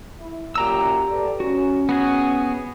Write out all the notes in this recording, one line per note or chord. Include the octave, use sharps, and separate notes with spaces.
E4
F#2 A#2 G4 A#5 E6
A4 B4 D5
C#4 F#4
B3 F#4 G#4